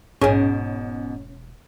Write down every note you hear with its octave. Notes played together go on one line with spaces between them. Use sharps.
E1 A#1 G#2 B2 C#4 G#4